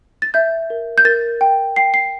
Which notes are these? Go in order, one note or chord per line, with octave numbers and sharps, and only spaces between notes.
A6
E5 G6
A#4
G6
A#4 A6
G5
G5 C7
C7